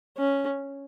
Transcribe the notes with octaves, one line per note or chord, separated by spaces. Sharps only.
C#4